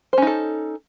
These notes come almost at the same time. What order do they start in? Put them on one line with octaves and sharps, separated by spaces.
C5 C#4 D#4 A4